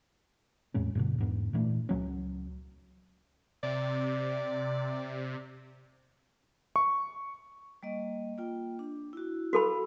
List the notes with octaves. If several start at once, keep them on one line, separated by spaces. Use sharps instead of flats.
E2 A2 G#3 C#4
G2 B2 D3
E2 G#2 B3
A#2 E3 A3 D4
C#2 F#3 C#4
C3 D5
C#6
G3 A#3 D#5
A#3 F4 G5
D4
E4 F#4
F#4 A4 F5 B5 E6